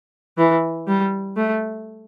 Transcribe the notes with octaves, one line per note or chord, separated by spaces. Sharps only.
E3
G3
A3